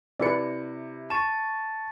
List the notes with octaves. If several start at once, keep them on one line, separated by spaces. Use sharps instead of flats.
C3 E4 B4 D5 C#7
A5 C#6 A6 E7